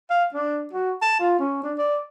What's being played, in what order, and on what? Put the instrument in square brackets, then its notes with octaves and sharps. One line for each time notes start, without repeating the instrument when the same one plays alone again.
[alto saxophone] F5
D4
F#4
A5
F4
C#4
D4
D5